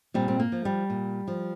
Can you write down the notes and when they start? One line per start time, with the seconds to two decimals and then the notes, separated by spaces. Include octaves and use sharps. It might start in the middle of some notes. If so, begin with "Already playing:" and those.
0.14 A#2 G3 C4
0.28 C4
0.40 A#3
0.52 F3
0.65 G3
0.90 A#2
1.28 F3